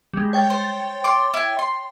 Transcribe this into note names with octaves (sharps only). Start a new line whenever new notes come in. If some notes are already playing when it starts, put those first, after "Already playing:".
G3 G#3
C#5 G5 A6
C5
C6 D6
E4 G#5
C6